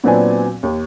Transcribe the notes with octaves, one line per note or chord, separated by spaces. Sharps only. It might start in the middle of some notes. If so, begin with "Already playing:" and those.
A#2 F#3 B3 C4 D4 G#5
D#2